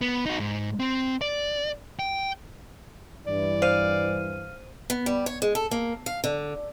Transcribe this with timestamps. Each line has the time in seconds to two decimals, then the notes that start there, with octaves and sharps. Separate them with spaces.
0.01 B3
0.26 D#4 F#4
0.40 G#2
0.80 C4
1.21 D5
1.99 G5
3.27 G2 E3 D5
3.62 C5 F5 D#7
4.90 B3
5.06 G3
5.26 C#5
5.42 G#3
5.55 A4
5.71 A#3
6.06 F5
6.24 D3